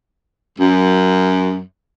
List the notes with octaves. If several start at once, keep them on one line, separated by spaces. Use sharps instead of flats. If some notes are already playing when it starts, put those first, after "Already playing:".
F#2